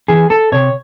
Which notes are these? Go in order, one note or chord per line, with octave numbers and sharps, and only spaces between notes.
E3 G#4
A4
C3 C#5